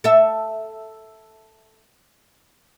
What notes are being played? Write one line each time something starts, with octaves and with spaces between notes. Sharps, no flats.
A4 E5